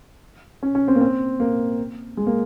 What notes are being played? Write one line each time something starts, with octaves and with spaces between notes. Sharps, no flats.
C#4
C#4
C4
A#3
C4
A#3
G#3
A#3